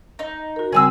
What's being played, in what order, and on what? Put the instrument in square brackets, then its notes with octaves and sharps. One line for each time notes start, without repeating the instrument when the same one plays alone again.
[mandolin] D#4
[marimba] F#4 A#4
[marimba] C#3 G3 C4 [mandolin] G#4 G#5 E6